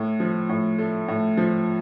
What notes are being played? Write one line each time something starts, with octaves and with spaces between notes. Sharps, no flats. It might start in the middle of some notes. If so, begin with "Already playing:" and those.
Already playing: A2
F3
A2
A3
A2
F3